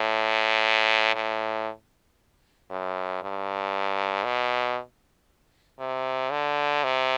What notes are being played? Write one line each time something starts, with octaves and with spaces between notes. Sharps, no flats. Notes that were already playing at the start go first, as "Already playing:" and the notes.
Already playing: A2
A2
F#2
G2
B2
C3
D3
C3